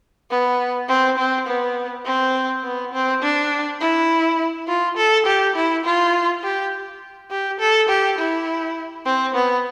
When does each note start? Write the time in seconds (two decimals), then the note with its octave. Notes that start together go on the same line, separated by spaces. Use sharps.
0.30 B3
0.89 C4
1.18 C4
1.47 B3
2.06 C4
2.64 B3
2.93 C4
3.22 D4
3.81 E4
4.68 F4
4.97 A4
5.26 G4
5.56 E4
5.84 F4
6.43 G4
7.30 G4
7.60 A4
7.89 G4
8.18 E4
9.06 C4
9.34 B3